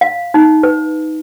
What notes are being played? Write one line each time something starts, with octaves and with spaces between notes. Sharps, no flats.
F5
D#4
B4